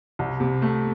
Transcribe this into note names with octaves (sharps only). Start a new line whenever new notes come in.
C2
C3
A3